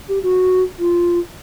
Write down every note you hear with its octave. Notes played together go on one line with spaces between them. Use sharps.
G4
F#4
F4